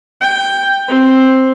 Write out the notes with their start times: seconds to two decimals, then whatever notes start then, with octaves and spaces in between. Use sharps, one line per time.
0.20 G5
0.88 C4